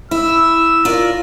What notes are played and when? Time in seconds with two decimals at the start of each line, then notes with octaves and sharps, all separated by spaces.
0.11 E4 E6
0.85 F4 A#4 D5